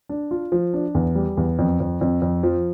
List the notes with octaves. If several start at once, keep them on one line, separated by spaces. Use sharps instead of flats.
D4
F4
F3
D4
E2
G3
E2
F2
F2
F2
F2
F3